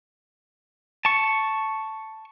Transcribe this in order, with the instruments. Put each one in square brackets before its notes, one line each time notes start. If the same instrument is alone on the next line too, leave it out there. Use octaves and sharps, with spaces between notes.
[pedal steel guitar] A5 C#6